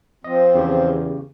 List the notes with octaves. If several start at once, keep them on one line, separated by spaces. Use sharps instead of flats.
F3 C4 D#5
E2 C#3 G4